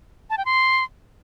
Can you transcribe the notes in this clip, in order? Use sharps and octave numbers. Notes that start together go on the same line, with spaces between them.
A5
G5
C6